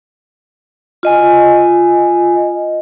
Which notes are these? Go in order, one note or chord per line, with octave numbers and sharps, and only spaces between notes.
F4 D#5 G#5